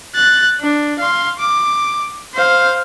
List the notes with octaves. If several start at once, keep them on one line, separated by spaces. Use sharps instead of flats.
F#6 A6
D4
F5 C6
D6
C5 F5